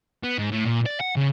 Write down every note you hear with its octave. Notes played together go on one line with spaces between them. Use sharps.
B3
G#2
A2
A#2
D5
F#5
C#3